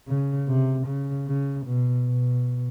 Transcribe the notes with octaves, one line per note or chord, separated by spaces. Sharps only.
C#3
C3
C#3
C#3
B2
B2